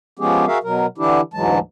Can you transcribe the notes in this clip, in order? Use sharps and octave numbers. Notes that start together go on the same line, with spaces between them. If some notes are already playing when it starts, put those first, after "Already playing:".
F3 G#3 B3 C#4 G4 G#4
F#4 G#4 A#4 E5 F5
B2 F#3 A#4
D3 E3 D4 E4 G4
D2 G#2 E3 F#3 G#3 A5